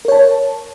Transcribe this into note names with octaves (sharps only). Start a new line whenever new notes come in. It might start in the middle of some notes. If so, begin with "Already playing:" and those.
A#4 C#5 A5